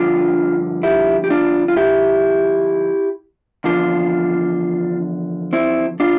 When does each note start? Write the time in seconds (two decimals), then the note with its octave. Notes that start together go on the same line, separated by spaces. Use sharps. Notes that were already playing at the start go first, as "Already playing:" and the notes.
Already playing: G2 D3 F3 D4 F4
0.83 E4 G4
1.24 G4
1.30 D4 F4
1.68 F4
1.77 E4 G4
3.64 E2 D3 F3 D4 F4
5.53 C4 E4
6.00 D4 F4